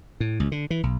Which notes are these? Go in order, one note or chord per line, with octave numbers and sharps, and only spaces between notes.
A2
C#2
D3
E3
B1